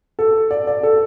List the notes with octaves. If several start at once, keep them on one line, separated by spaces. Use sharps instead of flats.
A4
D5
D5
A4